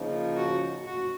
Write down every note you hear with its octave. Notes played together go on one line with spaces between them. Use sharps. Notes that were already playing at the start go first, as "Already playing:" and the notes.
Already playing: C#3 F3 A#3 D#4
F#4
F#4